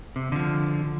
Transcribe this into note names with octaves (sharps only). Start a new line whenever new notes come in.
C3
D3 F3